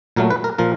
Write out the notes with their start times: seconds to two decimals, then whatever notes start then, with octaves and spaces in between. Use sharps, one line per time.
0.16 A#2 F#3 A3 A#4
0.30 B4
0.44 A#4
0.58 A#2 F3 A#4